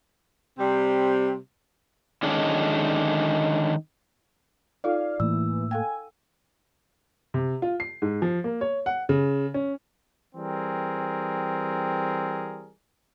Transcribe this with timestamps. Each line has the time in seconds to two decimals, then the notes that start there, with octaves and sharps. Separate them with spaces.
0.58 C3 G3 C4
2.23 D3 D#3 G#3 C#4 D4
4.84 D#4 F4 A4 D5 F5
5.20 A2 E3 A3 A#3 E6
5.71 A4 F5 G5 G#5
7.34 C3
7.62 F4
7.80 C7
8.02 G#2
8.22 F3
8.44 A#3
8.61 C#5
8.86 F#5
9.09 C#3
9.54 C#4
10.35 E3 G3 C4 G#4 A#4